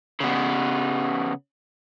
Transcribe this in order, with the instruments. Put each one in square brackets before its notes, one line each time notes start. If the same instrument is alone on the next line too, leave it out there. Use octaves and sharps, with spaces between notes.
[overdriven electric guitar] C#3 B3